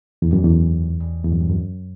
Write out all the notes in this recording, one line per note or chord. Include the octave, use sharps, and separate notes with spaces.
E2
F#2
E2
E2
F#2
G2
F#2